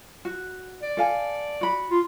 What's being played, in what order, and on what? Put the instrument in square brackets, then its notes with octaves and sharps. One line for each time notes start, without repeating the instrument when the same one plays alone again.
[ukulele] F#4
[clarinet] D5
[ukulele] A4 F5 G#5
F#4 B5
[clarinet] F4